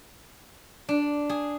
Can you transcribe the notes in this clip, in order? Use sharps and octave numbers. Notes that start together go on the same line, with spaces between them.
D4
G#4